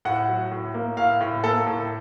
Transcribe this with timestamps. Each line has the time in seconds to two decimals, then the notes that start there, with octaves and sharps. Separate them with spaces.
0.05 A2 F#5
0.28 F#3
0.52 A2
0.74 A#3
0.97 A2 F5
1.21 A2
1.44 A#3 A4
1.67 A2